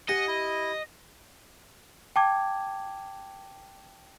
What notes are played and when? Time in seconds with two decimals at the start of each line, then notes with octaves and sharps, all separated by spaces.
0.09 G4 D#5 F#5 G#5 A#6
0.28 E4
2.16 G5 A5 D6 G#6